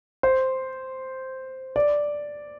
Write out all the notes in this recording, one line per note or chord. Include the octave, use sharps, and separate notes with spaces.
C5
D5